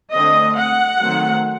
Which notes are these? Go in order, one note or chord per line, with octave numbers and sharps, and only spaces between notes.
D3 A3 C4 D#5
F#5
D#3 F#3 A3 C4